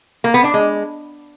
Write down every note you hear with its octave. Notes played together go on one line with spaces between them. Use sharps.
A#3
B3
D4
G#3